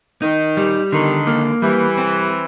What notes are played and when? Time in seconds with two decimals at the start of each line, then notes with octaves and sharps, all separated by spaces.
0.22 D#3 D#4
0.57 G3
0.92 D3 D#3
1.27 A#3
1.62 E3 G3
1.98 C4